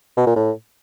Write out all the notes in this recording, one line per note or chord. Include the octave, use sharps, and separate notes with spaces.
B2
A#2
A2